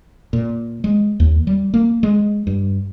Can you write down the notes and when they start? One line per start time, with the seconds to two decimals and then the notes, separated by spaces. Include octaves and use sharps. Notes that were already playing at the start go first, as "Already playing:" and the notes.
0.33 A#2
0.84 G#3
1.20 D#2
1.47 G3
1.74 A#3
2.03 G#3
2.47 G2